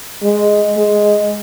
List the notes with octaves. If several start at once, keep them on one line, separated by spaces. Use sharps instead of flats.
G#3
G#3